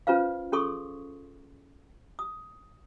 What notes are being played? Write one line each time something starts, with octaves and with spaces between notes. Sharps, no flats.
C#4 F4 B4 C5 F5
C#4 G#4 A4 C6 C#6 D#6
D#6